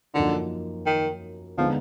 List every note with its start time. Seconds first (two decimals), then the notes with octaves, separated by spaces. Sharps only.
0.14 F#2 D3 F3 A#3 D#4
0.86 D#3
1.57 D3 F3 G#3 B3 D#4